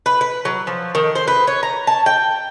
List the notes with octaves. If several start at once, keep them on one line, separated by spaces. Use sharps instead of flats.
B4
B4
F#3
F3
D#3
C5
B4
C#5
A#5
A5
G5